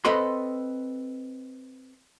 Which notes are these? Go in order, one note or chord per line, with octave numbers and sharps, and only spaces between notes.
C4 A4 B4 D#5 B5 C6